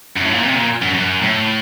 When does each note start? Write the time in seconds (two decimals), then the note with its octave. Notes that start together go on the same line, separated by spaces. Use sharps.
0.17 F#2
0.25 A2
0.33 A#2
0.43 C3
0.55 A#2
0.82 F#2
0.95 F#2
1.23 A2